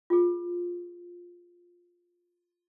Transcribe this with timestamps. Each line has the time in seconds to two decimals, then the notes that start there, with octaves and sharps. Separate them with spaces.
0.10 F4 G#4